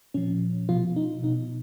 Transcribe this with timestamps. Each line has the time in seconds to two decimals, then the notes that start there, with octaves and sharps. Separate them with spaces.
0.14 A#2 F3 C#4
0.69 B2 F3 F4
0.96 D#4
1.23 B2 D#4